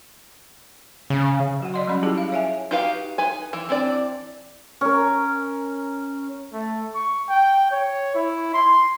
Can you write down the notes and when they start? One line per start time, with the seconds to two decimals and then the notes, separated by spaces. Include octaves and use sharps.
1.10 C#3
1.60 F#3 F#4 F#5
1.74 D5 D#5 C6
1.87 F#3 G3 C#4 B5
2.03 E4 F4 G4 G#4 A5
2.18 F5
2.32 C#5 E5 G#5
2.71 D#4 F#4 G4 B4 F5
3.18 D#4 B4 G#5
3.53 E3
3.69 E3 C4 D4 D5
4.81 C#4 A#4
6.53 A3
6.95 C#6
7.29 G5
7.72 C#5
8.15 E4
8.54 C6